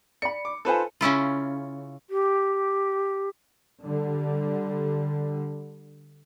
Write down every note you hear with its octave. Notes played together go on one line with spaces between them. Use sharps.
D5 B5 C#7
D6
D#4 F4 A4 B4 C5 G#5
C#3 C#4 E4 F4
G4
D3 G3